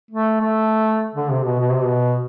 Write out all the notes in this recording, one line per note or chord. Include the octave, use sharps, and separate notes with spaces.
A3
A3
D3
C3
B2
B2
C3
B2